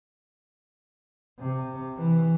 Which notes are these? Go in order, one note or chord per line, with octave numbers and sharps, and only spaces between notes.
C3
E3